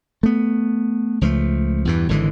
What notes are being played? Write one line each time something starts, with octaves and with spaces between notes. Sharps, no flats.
A3 B3
C#2 F3 F#3 A3
E2 G2 E3
G#1 D3 E3 G#3